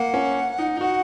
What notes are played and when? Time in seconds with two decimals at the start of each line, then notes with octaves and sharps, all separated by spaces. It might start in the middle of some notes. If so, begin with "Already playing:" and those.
Already playing: A#3 F#5
0.14 C#4
0.59 D#4
0.77 D#4
0.81 F#4 F#5